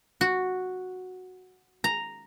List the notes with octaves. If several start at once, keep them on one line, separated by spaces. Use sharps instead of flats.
F#4
A#5